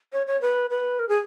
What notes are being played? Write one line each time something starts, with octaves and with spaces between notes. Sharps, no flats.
C#5
C#5
B4
B4
A#4
G#4